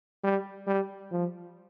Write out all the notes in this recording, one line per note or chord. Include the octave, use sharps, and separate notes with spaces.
G3
G3
F3